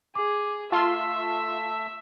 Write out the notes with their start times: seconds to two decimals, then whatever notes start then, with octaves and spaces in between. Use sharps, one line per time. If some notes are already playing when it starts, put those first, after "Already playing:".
0.15 G#4 D6
0.72 A3 F4 A4 E5 A5 C6